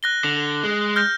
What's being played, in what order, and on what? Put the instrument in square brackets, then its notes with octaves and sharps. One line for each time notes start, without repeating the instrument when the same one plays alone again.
[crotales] F#6 A#6 G7
[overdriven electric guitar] D3
G#3
[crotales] F6 G6 A#6